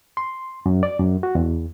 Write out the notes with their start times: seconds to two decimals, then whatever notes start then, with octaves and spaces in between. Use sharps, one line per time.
0.17 C6
0.66 F#2
0.83 D5
0.99 F#2
1.23 F#4
1.35 E2